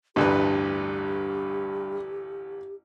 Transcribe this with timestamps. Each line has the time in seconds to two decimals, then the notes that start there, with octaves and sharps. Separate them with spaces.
0.16 A1 D2 G2 G4 B4